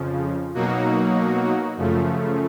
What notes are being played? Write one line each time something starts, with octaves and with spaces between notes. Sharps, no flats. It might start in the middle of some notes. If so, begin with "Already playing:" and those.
Already playing: F2 C#3 F3
B2 F#3 A#3 D#4 F#4
F#2 C#3 F3 A3